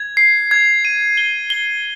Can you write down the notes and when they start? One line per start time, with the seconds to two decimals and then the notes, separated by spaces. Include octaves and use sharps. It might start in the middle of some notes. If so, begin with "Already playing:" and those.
Already playing: G#6
0.17 C7
0.51 G#6
0.85 D#7
1.17 G7
1.50 G7